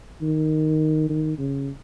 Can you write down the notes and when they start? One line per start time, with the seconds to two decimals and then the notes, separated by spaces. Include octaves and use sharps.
0.21 D#3
1.09 D#3
1.38 C#3